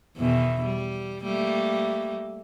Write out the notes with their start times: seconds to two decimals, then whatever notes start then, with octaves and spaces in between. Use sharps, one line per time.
0.17 E2 B2 D#3
0.64 G3
1.23 G3 A3 A#3